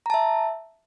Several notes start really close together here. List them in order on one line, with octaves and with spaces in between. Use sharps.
A#5 A5 E5